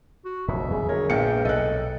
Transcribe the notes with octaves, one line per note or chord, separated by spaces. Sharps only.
F#4
F1 F2 C#3 E5
E2 C#3 G3 G#4
D3 F#3 A#4 C#5
A#1 G2 F5 G5 C#7
B1 A4 D#5 F#6